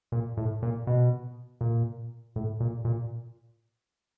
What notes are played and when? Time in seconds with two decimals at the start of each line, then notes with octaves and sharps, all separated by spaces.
0.12 A#2
0.37 A2
0.62 A#2
0.87 B2
1.61 A#2
2.36 A2
2.60 A#2
2.85 A#2